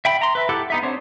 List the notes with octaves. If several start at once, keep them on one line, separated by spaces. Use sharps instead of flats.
E5 G5 B5
A#5 C6
B4 E5
E4 G4 A4 F#5
B3 D#4 E5
C4 D4 C5 C#5